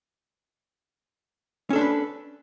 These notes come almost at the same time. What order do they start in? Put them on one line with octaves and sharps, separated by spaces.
C#4 A4 D4 C5 B4